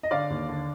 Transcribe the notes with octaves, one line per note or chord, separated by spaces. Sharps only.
D#5
D3 D5 F5
D#2
D3